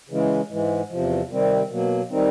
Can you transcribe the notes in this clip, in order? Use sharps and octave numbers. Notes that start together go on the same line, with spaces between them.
C#3 E3 G#3
G#2 E3 G#3
E2 C3 F3
C3 D#3 G3 C4
B2 F#3 A#3
D#3 G3 C4 D#4